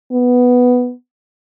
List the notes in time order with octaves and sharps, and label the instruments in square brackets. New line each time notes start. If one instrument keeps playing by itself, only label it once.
[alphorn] B3